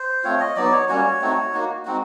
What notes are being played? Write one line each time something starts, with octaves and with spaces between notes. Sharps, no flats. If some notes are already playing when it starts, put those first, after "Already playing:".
Already playing: C5
A3 C4 F4 C#5
D#5
F#3 B3 D#4 D5
C#5
G3 A#3 C#4 F#4 C#5
A3 C4 D#4 F#4
A#3 D#4 F#4
G#3 C4 D#4 F#4